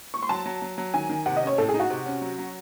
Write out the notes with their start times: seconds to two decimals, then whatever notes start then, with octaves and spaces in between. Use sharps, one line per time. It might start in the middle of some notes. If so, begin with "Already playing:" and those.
0.14 C#6
0.22 C6
0.29 F#3 A5
0.46 F#3
0.62 F#3
0.78 F#3
0.94 D#3 G#5
1.09 D#3
1.26 C3 F#5
1.37 D#5
1.43 C#4 C#5
1.58 A2 A4
1.69 G#4
1.74 D#4
1.80 F#4
1.90 C3
2.06 C#4
2.22 F#3
2.38 F#3